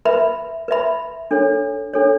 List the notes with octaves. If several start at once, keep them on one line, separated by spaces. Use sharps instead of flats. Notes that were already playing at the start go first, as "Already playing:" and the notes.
B4 E5 B5
B4 E5 B5
D4 A4 C#5
D4 A4 C#5